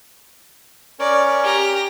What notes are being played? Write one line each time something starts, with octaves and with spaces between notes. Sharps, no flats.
C#4 A#4 C#5 D5
G4 A#5